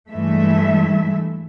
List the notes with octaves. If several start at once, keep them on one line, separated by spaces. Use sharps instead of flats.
G2 E3 G#3 A3 E5